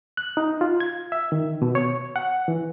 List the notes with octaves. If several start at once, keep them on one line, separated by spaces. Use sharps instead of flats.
F#6
D#4
F4
G#6
E5
D#3
B2
C#5
F#5
E3